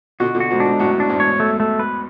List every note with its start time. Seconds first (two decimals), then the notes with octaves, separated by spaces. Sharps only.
0.20 B2 D3 F#4
0.35 B2 D3
0.40 F#4
0.50 G#2 B2
0.60 D4
0.65 G#2 B2
0.79 F#2 A2 F#4
1.00 D4
1.09 E2 G#2
1.20 C#5
1.40 A3
1.60 A3
1.80 B4